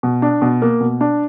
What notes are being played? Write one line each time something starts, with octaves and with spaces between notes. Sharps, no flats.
B2
D4
B2
A#3
B2
D4